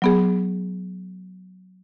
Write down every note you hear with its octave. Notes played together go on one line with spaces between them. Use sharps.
F#3 B3 G#4